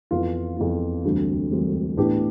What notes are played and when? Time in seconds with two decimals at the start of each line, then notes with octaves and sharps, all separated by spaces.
0.11 F2 E3 B3 F4
0.57 F2 E3 B3 F4
1.04 E1 D2 D3 G3 C4
1.51 E1 D2 D3 G3 C4
1.97 A2 E3 B3 D4 G4